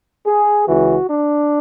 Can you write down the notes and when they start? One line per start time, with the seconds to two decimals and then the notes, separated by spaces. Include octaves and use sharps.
0.26 G#4
0.67 C#2 C#3 E3 F#4
1.08 D4